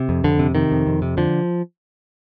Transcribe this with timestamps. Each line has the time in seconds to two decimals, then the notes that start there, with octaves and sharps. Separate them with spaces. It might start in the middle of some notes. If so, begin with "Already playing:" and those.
Already playing: C3
0.09 F2
0.24 F2 D3
0.39 C3
0.55 C3 D#3
0.71 F2
0.87 F2
1.02 C3
1.17 D3 F3